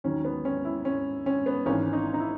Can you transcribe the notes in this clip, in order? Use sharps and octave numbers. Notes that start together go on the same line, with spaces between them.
D#2 D#3 F#3 C#4
B3
C#4
E4
C#4
C#4
B3
G#1 G#2 E3 C#4
D#4
D#4
E4